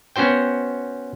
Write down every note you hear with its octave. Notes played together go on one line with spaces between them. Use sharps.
B3 C#4 F#4 C5 G5